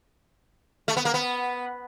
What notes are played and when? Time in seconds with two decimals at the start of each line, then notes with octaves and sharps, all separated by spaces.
0.88 A3
0.97 B3
1.05 A#3
1.14 B3